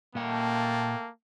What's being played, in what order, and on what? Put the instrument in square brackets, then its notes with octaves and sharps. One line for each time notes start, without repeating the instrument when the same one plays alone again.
[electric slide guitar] A#2 F#5 [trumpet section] A3 G5 A5 [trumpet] A#3